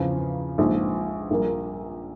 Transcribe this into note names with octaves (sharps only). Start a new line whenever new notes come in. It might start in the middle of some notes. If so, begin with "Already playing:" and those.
Already playing: E2 C#3 F3
A#1 G#2 F3
A#1 A#2 G3 A#3